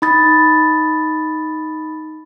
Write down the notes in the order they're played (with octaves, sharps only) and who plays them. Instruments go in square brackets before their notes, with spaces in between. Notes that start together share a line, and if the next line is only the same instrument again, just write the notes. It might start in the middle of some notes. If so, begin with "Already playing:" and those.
[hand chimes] D#4 B5 D#6 A6